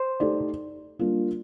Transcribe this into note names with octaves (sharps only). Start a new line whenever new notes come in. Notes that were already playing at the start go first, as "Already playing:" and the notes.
Already playing: C5
A3 D#4 G4 D5
G3 A#3 D4 F4